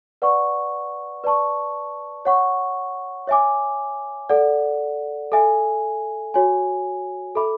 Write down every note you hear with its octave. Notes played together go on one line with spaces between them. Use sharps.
B4 D5 F#5 C#6
B4 D5 A5 C#6
C#5 F#5 C#6
C#5 E5 G#5 D6
A4 D5 F#5
A4 E5 G#5
F#4 C#5 G#5
A4 E5 B5 D6